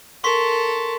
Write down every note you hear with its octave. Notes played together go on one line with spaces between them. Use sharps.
A4 A#4 C6 C#6 B6